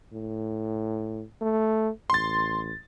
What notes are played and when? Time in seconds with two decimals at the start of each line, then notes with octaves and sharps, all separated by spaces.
0.13 A2
1.41 A3
2.10 A1 C6 A6